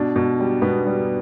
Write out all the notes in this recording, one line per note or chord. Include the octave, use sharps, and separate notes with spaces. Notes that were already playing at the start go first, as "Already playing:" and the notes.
Already playing: B2 D4
B2
G3
B2 B3
G3